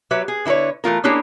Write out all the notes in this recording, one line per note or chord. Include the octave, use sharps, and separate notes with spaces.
F#3 G4 B4 C#5 E5
G#4
D3 E4 A#4 B4 C#5
E3 A3 F4 A#4
A#3 C#4 D4 E4 G4 G#4